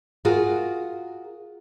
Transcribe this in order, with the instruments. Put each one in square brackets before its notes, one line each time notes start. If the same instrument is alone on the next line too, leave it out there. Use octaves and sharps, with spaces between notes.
[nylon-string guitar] F4 F#4 G#4 A#4